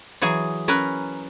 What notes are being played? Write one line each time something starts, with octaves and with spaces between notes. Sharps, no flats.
E3 F#3 G#4
C#4 A#4 B4 A#5